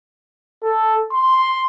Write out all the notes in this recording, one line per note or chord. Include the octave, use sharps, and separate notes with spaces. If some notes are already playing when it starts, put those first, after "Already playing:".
A4
C6